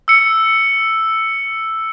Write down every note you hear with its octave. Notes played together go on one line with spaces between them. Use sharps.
E6 C#7